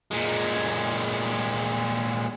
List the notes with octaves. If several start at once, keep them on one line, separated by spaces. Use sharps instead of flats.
A#2 G#3